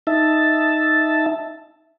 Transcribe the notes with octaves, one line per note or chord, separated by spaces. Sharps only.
D#4 E5 A5